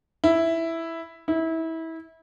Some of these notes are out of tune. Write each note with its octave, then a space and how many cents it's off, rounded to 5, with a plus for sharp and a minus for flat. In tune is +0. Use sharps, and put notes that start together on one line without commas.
E4 +0
E4 -25